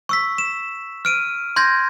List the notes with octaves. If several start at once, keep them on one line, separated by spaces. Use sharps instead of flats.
C#6 E6 B6
E7
F6 D7 D#7
C6 G6 G#6 A#6